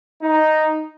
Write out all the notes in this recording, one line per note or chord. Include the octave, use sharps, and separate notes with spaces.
D#4